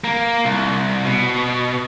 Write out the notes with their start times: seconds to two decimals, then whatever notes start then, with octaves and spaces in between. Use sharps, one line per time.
0.04 A#3
0.45 C2
1.05 B2